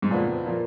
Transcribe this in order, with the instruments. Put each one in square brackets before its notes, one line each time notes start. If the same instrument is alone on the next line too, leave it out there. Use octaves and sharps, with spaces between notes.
[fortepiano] G#2
[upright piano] F#1 F2 F3 B3 [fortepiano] A#2
[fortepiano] A#2 [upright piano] F3 A#3